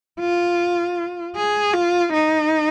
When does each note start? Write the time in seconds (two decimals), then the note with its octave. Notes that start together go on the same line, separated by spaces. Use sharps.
0.20 F4
1.36 G#4
1.74 F4
2.13 D#4